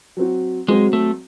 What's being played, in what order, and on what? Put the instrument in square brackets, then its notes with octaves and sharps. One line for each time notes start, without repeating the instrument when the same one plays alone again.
[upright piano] F#3 C4 F#4
[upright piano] F#3 C4 F#4 [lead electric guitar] G#3
[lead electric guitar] A3